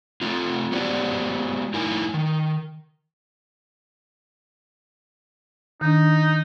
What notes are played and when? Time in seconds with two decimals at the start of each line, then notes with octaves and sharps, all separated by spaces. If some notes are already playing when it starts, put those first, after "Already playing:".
0.21 A3 C4 F4
0.72 G#3 B3 F#4 G4 C5 D5
1.74 A2 D#4 E4 A#4 G#5
2.14 D#3
5.81 D#3 D4 D#4